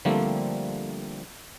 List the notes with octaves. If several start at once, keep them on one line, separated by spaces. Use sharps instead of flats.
D3 F3 G3 A3 A#3 C4